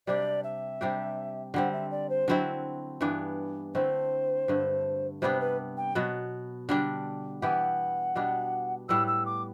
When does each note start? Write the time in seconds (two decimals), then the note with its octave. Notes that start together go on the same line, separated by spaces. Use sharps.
0.07 C3 G3 D4 G4 D5
0.44 E5
0.81 C3 G3 D4 G4
1.54 D3 G3 C4 F#5
1.73 E5
1.91 D5
2.10 C5
2.28 D3 F#3 C4 E4
3.01 G2 E3 B3 D4
3.74 D3 A3 C4 E4 C5
4.48 G2 D3 A3
5.22 C3 G3 B3 D4 C5
5.40 B4
5.77 G5
5.95 B2 F#3 B3
6.69 D3 G3 D4
7.42 E3 B3 E4 G4 F#5
8.15 B2 G3 B3 D4
8.89 A2 G3 B3 E6
9.07 E6
9.26 D6